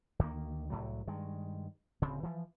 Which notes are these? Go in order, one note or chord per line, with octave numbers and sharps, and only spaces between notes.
D2 D#3 A#3
C2 A2 F#3
G2 D#3 G#3
D1 C#3 C4
E3 F3